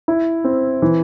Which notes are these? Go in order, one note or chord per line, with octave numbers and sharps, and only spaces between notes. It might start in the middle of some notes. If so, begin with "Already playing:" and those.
E4
C4
E3